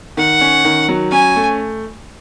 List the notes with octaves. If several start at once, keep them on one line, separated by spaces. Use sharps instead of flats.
D#3 F#5
C#4
D#3
F#3
C#4 G#5
A3